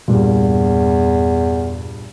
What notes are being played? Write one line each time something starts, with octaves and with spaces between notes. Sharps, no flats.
E2 G2 A#2